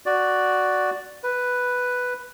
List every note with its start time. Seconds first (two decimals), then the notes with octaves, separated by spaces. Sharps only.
0.06 F#4 D5
1.24 B4